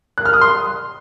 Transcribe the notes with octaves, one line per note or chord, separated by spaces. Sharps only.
F#6
F6
D#6
C6